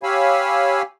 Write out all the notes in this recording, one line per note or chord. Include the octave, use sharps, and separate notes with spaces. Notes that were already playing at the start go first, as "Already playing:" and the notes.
G4 C#5 F5 G#5 B5 E6